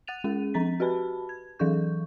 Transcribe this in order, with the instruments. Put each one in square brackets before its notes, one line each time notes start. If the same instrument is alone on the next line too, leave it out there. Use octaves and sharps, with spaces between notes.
[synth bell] F#5 F#6 A6 D#7 F7
G#3 C#4 G#4 D#7
F3 C4 A#5 A6 B6
F#4 G4 B4 A5 B5
G#6
E3 F#3 G#4 A4 C#6 G6